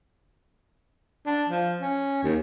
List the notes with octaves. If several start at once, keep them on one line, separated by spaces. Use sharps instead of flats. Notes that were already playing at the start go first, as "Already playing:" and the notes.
D4
F3
C#4
D#2